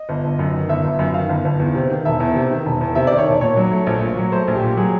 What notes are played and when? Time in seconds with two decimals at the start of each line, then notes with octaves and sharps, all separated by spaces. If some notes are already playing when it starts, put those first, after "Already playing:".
Already playing: D#5
0.09 G1
0.24 G1
0.39 F#2
0.54 D#3
0.69 G1 E5
0.84 G1
0.99 F#2
1.14 D#3 F5
1.29 G1
1.45 G1
1.60 E2
1.75 C3
1.90 D#3
2.05 E1 E5
2.20 E2
2.36 C3
2.51 D#3
2.66 E1
2.81 E2
2.95 C3 E5
3.07 D#3 D5
3.18 C#5
3.27 E1 D5
3.41 A#2 C#5
3.57 F#3
3.72 A3
3.87 A#1
4.02 A#2
4.17 F#3
4.32 A3 C5
4.48 A#1
4.55 G4
4.63 A#2
4.77 F#3 G#4